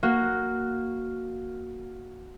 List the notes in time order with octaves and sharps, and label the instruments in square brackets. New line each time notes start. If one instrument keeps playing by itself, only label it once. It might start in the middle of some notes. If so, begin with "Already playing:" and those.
[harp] A#3 F#4